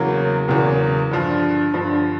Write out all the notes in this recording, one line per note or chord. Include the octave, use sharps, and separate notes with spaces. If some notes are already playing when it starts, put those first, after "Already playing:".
Already playing: E2 C#3 F#3 A#3
E2 C#3 F#3 A#3
G2 D3 F3
G2 D3 F3